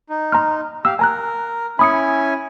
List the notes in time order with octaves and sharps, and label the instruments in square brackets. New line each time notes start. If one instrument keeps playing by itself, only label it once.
[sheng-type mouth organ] D#4
[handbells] A#5 C6 F6
[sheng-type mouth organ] G4 F5 [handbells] E6
[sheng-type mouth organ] A#4 [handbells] G#5 A#5 F#6
[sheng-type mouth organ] C#4 E4 G#5 [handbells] B5 D#6 C#7